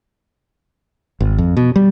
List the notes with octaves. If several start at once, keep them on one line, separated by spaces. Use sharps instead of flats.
G#1
F2
B2
G3